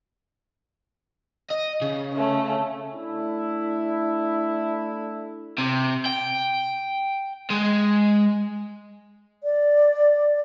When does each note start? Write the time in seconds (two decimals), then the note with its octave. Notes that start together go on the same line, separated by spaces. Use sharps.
1.50 D#5
1.81 C#3
2.14 A3 C#4
2.94 A3 D4 E4
5.58 C3
6.06 G5
7.50 G#3
9.43 D5